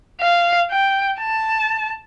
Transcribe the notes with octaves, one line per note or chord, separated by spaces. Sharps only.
F5
G5
A5